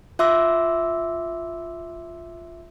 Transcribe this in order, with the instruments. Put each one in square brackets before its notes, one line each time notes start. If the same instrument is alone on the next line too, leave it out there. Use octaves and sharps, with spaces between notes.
[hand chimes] F4 E5 C6 D6 E6